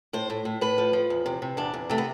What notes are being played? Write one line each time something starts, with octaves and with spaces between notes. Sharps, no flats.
A2 C5
A2
A2
A2 B4
F3
F3
E2
C3
C3
E2 D4
E2
C3 A3
B3